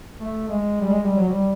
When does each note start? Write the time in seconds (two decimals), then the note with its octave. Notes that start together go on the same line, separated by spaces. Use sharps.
0.20 A3
0.48 G#3
0.80 G3
0.89 G#3
1.02 G3
1.16 F#3
1.29 G3